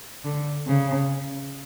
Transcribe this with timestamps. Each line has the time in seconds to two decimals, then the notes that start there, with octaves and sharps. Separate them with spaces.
0.25 D3
0.67 C#3